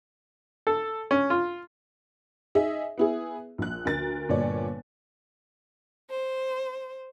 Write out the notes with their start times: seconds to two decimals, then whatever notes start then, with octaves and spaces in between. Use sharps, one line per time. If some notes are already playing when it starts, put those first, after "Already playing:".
0.67 A4
1.11 C#4
1.30 F4
2.55 D#4 G#4 D#5 E5
2.98 B3 E4 G#4
3.58 A#1 F#6
3.85 D2 A#4 A6
4.29 G1 A#2 C#5 D5
6.10 C5